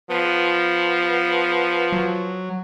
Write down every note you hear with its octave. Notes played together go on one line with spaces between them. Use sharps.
F3 B3
F#3